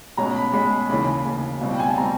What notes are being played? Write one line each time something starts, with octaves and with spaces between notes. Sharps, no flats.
B2 G#3 C#4 A#5
B5
B2 G#3 C#4 B5
D#2 C#3 E3 B5
D#2 C#3 E3
C#2 B2 G3 C4
G5
G#5
A5
B2 G3 C4 A#5